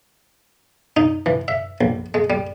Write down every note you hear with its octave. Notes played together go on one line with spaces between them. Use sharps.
D#4
E3
E5
A#1
G#3
G3